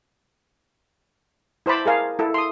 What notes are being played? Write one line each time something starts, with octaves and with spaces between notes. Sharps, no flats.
E4 C5 A5 B5 D6
G#4 A#4 F5 G#5
E4 A4
C6 D#6